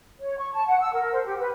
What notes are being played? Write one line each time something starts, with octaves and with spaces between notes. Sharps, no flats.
C#5
C#6
A5
F#5
E6
A#4
C5
G4
B4